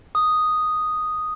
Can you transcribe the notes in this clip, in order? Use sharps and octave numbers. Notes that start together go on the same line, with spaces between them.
D#6